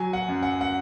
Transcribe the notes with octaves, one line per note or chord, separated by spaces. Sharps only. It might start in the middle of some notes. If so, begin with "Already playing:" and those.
Already playing: F#3 G#5
F#5
F#2
F#5
F#5